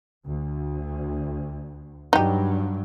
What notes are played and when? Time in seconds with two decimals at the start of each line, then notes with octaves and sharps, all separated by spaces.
0.24 D2
2.13 G2 F#3 G3 D#4 G4